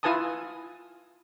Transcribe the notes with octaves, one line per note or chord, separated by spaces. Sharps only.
E4 F4 B4 G#5 A5 D#6